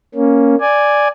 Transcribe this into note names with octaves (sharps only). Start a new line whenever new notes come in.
A#3 C#4
D5 G#5